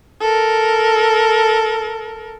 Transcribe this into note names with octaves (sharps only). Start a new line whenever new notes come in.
A4 A#4